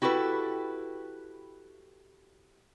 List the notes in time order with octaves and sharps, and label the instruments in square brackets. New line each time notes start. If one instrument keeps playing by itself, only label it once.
[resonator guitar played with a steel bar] E4 F#4 G4 A4 B4